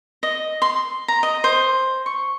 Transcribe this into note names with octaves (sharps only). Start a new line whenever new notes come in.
D#5
C6
A#5
D#5
C5
C#6